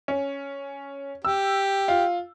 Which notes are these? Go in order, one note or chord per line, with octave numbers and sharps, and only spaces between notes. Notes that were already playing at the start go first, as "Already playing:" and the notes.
C#4
G4 E6
F4